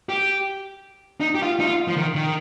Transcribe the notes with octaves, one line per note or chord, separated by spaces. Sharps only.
G4
D#4
G4
F4
D#4
F4
F3
D#3
D#3